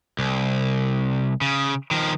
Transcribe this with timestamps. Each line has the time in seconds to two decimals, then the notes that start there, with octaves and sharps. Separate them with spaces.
0.19 C2
1.41 C#3
1.91 D#3 F3